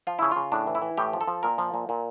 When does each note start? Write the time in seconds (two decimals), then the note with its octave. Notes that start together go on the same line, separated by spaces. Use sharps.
0.07 F3 F4
0.19 C#3 E4
0.31 C#3 F4
0.52 A2 D4
0.67 E3
0.75 E4
0.82 E3
0.97 A2 G4
1.13 F3
1.21 A4
1.27 F3
1.43 A#2 A#4
1.58 F3
1.74 A#2
1.89 A#2